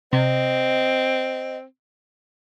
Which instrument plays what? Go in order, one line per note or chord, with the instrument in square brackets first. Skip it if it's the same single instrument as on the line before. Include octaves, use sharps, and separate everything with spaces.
[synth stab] C3 [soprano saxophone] C4 [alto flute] D#5